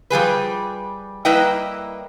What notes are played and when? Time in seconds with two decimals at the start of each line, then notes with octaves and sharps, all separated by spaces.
0.10 F3 G3 G#4 B4
1.25 G3 A#3 E4 B4 D#5 G5